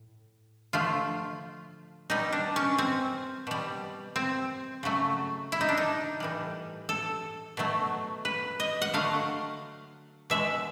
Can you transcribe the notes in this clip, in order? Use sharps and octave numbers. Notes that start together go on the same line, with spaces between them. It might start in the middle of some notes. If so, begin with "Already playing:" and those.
Already playing: A2
D3 F3 A3 F4
B2 G3 D#4
D4
C#4
C4
B2 G3
C4
C#3 F#3 A3
E4
D#4
D4
D#4
A2 E3 G3
A4
B2 F#3 A3
B4
D#5
F#5
D3 F#3 A3 F5
B2 G#3 E5